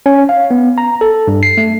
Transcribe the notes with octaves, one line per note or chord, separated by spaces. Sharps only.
C#4
F5
B3
A#5
A4
G2
C7
A3